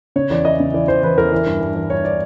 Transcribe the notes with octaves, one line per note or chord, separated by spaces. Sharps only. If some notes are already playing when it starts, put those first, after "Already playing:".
C#3 C#5
E2 D5
E3 D#5
C#3
E3 D5
E3 C5
E2 B4
E2 A#4
E3
G2
G2
E3
G2 C#5
D5